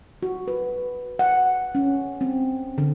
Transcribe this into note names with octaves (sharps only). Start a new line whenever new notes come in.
F#4
B4
F#5
C#4
C4
D3